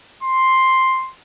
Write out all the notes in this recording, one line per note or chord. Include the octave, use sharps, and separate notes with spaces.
C6